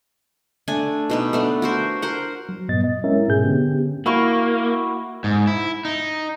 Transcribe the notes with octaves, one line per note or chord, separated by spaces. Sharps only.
A3 D4 G#5
B2 D#4 B4
A3 B3 D4
F#4 A#4 C5
A#4 C5 F#5
F#3
G2 A#2 B3 D#5 A6
D#5
G#3 C#4 E4 A#4 E5
G#2 B2 G#4 G6
D3 B3 C#4 G4
A#3 E4 F#4 C#6
G#2
E4
D#4